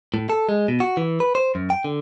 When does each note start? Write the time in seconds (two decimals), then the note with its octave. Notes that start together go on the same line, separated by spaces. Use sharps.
0.14 A2
0.30 A4
0.49 G#3
0.68 B2
0.80 F#4
0.97 E3
1.20 B4
1.35 C5
1.55 F#2
1.70 G5
1.85 D3